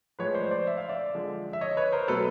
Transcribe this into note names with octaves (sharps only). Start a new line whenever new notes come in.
A2 F3 G#3 B4 C#5
C5 D5
C5 D5
E5
F5
D5 E5
D3 F3 G#3
E5
C#5 D#5
B4 C#5
A#4 C5
B2 F#3 A3 A4 B4